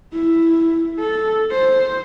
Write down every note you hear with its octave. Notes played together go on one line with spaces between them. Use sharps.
E4
A4
C5